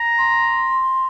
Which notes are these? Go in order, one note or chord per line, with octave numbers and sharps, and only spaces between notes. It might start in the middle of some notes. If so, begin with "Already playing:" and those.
Already playing: A#5
C6